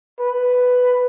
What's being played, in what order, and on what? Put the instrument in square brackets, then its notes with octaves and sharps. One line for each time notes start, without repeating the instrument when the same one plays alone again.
[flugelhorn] B4